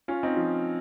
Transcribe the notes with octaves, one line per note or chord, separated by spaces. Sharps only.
C#4 F4
C4 D#4
F3